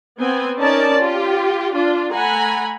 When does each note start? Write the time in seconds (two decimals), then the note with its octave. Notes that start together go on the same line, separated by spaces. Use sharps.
0.19 B3 C4 G#5
0.59 C#4 D#4 A#4 D5 A5
0.98 F4 G4
1.74 D4 F4
2.12 A3 F#5 G#5 A#5 B5